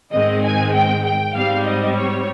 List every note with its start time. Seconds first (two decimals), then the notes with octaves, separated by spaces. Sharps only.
0.12 G#2 D#3 G#3 C4 D#5
0.43 G#5
0.74 G5
1.05 G5
1.35 G#2 G3 C4 F5
1.66 D#5
1.96 C#5